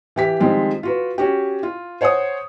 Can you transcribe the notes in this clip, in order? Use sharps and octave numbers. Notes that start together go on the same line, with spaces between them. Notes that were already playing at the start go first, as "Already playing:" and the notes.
E3 G4 B6
D#3 F3 G3 G#3 C4
F4 F#4 B4
C#4 F#4 G4
F4
C5 C#5 F#5 G#5 D#6